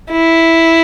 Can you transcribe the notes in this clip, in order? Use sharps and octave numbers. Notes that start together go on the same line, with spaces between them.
E4